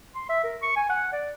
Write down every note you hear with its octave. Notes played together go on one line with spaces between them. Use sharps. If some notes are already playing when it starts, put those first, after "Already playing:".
C6
E5
A#4
C#6
G#5
F#5
D5